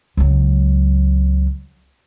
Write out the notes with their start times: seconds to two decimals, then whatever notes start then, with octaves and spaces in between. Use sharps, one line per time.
0.17 C#2 F#3